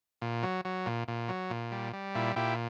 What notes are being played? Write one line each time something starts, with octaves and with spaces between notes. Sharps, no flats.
A#2
F#3
F#3
A#2
A#2
F#3
A#2
G3
G3
A#2 E4
A#2 E4 G4